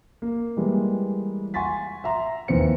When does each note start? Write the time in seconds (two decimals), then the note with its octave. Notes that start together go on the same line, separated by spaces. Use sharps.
0.22 A#3
0.57 E3 G3 G#3 A#3
1.54 F#5 G#5 C6 C#6 A6 B6
2.04 E5 F#5 A#5 C6
2.48 D#2 E3 B3 C4 C5 C#7